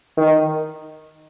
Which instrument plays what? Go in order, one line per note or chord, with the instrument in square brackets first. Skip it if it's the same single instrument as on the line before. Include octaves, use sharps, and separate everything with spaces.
[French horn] D#3